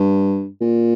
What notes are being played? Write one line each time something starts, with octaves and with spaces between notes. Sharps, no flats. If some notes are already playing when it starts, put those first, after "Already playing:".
Already playing: G2
A#2